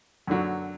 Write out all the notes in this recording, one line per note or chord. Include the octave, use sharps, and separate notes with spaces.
F#2 D3 F#3